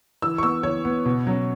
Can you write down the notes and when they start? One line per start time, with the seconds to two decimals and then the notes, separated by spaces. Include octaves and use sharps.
0.22 E3 E6
0.38 C#6
0.43 B3 E6
0.63 E3 C#5
0.85 B3
1.05 B2
1.27 F#3 C#4